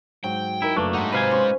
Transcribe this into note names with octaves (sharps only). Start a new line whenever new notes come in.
G#2 F#3 G5
D#4 E4 A#4
F#1 A3 A#3 D4 B4 C#6
G#3 D#4 F#5 A#5
C3 B4 F5 G#5
C#4 C6 D6